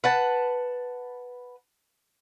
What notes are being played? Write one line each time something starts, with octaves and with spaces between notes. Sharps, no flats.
B4 F#5 A5